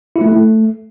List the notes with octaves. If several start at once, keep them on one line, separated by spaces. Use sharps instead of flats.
E4
A3
E4
A3